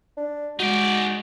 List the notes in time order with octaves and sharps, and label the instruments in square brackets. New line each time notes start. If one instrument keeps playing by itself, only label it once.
[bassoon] D4
[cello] G#3 [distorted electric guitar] D#4 D5 [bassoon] F#4